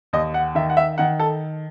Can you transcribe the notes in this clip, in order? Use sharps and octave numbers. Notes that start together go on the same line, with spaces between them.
D#2 D#5
F#5
D#3 E5
F#5
E5
D#3 F#5
A4